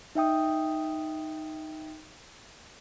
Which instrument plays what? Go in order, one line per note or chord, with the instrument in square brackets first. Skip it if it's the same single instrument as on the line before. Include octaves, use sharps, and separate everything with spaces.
[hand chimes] D#4 E5 G5 D#6